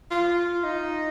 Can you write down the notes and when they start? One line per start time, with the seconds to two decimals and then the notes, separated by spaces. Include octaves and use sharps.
0.11 F4
0.64 D#4